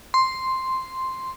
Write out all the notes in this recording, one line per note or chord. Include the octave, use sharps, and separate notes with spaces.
C6